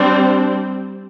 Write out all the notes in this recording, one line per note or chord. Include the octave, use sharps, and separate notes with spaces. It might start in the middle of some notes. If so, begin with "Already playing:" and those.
Already playing: G3 C4 D4